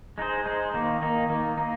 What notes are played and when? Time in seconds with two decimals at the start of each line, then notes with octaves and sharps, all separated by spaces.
0.18 G#3 D#4 G#4 C5
0.46 G#3 D#4 G#4 C5
0.74 D#3 A#3 D#4
1.02 D#3 A#3 D#4
1.29 D#3 A#3 D#4
1.57 A#3 D#4